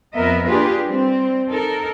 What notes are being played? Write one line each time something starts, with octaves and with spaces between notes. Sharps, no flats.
F2 B3 A#4 D#5 E5
A#3 D4 F4 G4 G#4 B4
G3 C4
D#4 A4 A#4